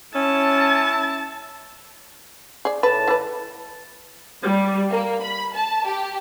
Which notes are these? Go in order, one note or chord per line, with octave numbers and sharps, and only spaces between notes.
C#4 E4 A5
G#4 D5
A2 B4 A5
E3 B4
G3
A#3
B5
A5
G4